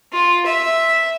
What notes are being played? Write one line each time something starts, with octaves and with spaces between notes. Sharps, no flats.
F4
E5